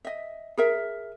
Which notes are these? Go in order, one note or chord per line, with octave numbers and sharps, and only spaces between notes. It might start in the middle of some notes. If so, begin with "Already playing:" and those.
D#5 E5
G#4 A#4 E5